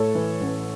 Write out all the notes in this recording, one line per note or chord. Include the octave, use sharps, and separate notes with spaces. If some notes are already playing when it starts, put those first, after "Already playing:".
Already playing: A2 A4 C#5
E3
A1